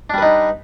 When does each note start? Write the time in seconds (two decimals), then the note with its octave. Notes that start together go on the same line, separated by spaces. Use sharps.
0.10 D4
0.14 G3
0.18 B4
0.22 D#4